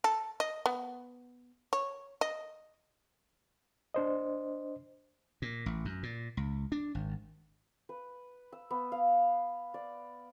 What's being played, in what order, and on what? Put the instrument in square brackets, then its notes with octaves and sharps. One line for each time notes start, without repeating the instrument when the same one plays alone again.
[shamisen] A4
D#5
B3
C#5
D#5
[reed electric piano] D4 C5 D#5
[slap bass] A#2
A1
F#2
A#2
C#2
D4
G#1
[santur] B4
E6
B3
F5
D5